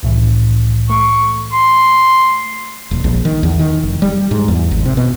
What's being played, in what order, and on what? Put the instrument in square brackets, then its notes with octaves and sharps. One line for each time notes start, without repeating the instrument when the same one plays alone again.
[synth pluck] C2 A2 E3
[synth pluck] A3 [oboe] C#6
[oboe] C6
[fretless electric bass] D#1
A#1
D#3
E2
D#3
F1
G3
G#2
E2
G#1
C3
B2